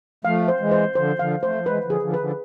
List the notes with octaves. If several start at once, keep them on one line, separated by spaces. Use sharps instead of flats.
F3 A3 F5
C5
E3 G#3
C5
D3 F3 C5
D3 F3 F5
F3 A3 C5
F3
E3 G#3 B4
D3 F3
G#4
D3 F3
B4
D3 F3